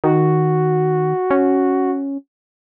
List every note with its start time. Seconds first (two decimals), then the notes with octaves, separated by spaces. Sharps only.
0.04 D#3 F#4
1.31 C#4